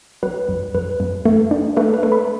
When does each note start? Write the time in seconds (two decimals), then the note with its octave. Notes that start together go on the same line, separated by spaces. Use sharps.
0.23 F#3 B4
0.49 F#2
0.75 F#2 B4
1.00 F#2
1.25 A3
1.51 D4
1.76 A3 B4
1.94 B4
2.03 A3
2.12 B5